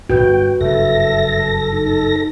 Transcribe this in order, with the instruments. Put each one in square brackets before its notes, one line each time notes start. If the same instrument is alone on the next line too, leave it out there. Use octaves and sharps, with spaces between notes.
[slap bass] D1 G1 [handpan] F#4 B4 [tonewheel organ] G5
[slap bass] F#1 G2 [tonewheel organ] A4 A#6 [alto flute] E5
[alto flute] D#4